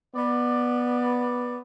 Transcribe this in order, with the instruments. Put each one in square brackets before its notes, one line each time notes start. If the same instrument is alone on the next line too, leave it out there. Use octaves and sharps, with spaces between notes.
[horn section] B3 D5